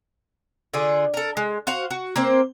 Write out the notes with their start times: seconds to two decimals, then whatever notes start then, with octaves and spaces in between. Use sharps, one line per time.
0.73 D3 F4 G#4
1.14 A4 A#4
1.37 G#3
1.67 F#4 C5 F5 F#5
1.91 F#4
2.16 A#3 C4 C5